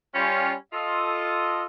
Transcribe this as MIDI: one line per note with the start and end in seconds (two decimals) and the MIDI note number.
0.15 0.52 55
0.15 0.52 61
0.15 0.52 65
0.73 1.64 65
0.73 1.64 69
0.73 1.64 75